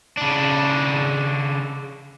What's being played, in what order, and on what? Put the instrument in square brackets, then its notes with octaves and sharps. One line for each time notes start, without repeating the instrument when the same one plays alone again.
[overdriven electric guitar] C#3 D4